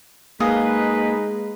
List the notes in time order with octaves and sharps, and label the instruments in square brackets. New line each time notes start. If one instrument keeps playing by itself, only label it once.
[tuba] G#3 [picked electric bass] A#3 [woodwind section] D#4 B4 [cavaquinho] G#4 D#5 F5